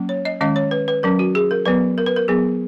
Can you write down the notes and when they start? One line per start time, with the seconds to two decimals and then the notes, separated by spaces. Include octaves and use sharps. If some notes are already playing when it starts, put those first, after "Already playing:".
Already playing: F#3 A#3 C#4
0.09 C#5
0.25 D#5
0.41 D#3 G#3 C#4 D#5
0.56 C#5
0.71 B4
0.88 B4
1.03 F#3 C#4 A#4
1.19 F#4
1.35 G#4
1.51 A#4
1.66 F#3 B3 B4
1.98 A#4
2.06 B4
2.16 A#4
2.28 F#3 B3 G#4